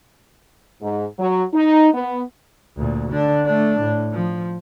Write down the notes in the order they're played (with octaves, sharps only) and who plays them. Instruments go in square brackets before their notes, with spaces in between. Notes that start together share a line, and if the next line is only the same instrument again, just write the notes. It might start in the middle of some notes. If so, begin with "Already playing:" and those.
[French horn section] G#2
F#3
D#4
B3
[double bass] D2 A#2
D3 D4
A3 D4
A2
F3